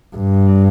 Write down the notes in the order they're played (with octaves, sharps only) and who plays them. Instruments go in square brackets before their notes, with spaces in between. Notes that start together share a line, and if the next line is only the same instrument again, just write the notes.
[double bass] G2